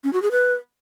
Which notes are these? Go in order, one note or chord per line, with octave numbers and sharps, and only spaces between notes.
C#4
F#4
G#4
B4